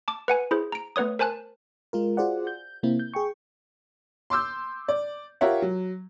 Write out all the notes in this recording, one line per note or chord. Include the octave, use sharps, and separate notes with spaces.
A5 D6
B4 F#5 G#5
E4 G#4 C5
A#5 D7
A3 B3 B4 C#5 D#6
A#4 C5 G#5 A5 F#6
G#3 F4 A#4
F4 F#4 G#4 C5 D5 F#5
G6
C3 A#3 C4 E4
G6
G#4 G5 C#6
C6 D6 E6 G6
D5
F4 G4 A#4 C#5 E5 F#5
F#3